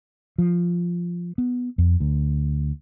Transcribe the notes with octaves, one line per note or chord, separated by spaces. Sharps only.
F3
B3
F2
D2